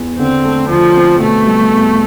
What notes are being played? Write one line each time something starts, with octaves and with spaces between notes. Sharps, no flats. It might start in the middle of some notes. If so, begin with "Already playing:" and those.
Already playing: E2
D3 C4
A3
D2 F3
C4
B2 A3
G3
E2